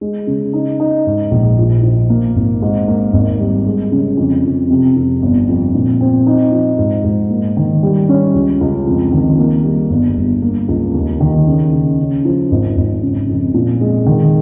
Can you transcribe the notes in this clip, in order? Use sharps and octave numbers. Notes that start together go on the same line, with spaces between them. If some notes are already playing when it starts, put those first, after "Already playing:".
G#3
C#3
D#4
D#4
G#2
A#1
F3
F3
A#3
G#1
G#2
A#3
G#1
G3
G#3
C#3
F2
F2
C3
F2
G1
F2
A#2
C4
D#4
F3
G#2
G#2
A#3
D#3
G3
C#4
C#2
C#2
F2
D#3
A#3
G3
G1
G1
A#3
C#2
D#2
D#3
C#3
C#3
C#3
F3
G#1
G#1
C#3
F2
A#2
G#3
D#3